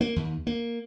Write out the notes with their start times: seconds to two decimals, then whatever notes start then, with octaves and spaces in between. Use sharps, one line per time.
0.01 A#3
0.16 D#2
0.47 A#3